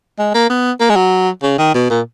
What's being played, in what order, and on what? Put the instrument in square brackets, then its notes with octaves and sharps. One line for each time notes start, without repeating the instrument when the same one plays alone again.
[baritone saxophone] G#3
A#3
B3
A#3
G#3
F#3
C#3
D#3
B2
A#2